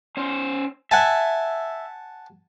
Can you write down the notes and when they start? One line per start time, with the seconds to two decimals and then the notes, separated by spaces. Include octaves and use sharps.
0.17 C#4 C5
0.91 E5 F#5 G#5 A5